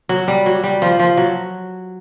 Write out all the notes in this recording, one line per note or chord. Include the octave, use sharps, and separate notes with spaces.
F#3
G3
F#3
G3
F3
F3
F#3